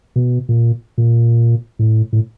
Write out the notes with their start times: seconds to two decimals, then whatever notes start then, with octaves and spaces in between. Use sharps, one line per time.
0.16 B2
0.49 A#2
0.98 A#2
1.79 A2
2.13 A2